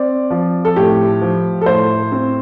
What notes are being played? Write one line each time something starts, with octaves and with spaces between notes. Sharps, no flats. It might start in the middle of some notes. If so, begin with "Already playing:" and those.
Already playing: C4 D5
F3
A4
A2 G4
F3
A4
A2 C5
C4